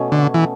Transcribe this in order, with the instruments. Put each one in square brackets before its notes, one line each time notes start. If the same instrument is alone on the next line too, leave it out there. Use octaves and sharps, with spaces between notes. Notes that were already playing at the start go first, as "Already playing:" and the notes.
Already playing: [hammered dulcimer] B2 A3 C#4
[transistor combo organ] D3
E3